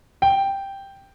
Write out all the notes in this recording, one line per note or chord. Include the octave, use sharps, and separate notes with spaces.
G5